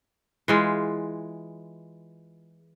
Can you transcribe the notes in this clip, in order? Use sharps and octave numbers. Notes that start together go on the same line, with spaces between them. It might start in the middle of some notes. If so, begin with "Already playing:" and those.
E3 G#3 F4